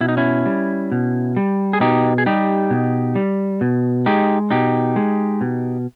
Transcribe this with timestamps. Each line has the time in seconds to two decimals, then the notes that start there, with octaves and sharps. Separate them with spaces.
0.01 B2 E4
0.09 D#4
0.17 C#4 E4
0.46 G3
0.92 B2
1.36 G3
1.73 G#4
1.80 B2 D#4 G4
2.18 G#4
2.26 G3 D#4 G4
2.71 B2
3.16 G3
3.61 B2
4.06 G#3 D#4 G4
4.51 B2 D#4 G4
4.96 G#3
5.41 B2